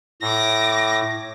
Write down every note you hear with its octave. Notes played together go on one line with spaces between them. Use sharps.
A2 D6 A#6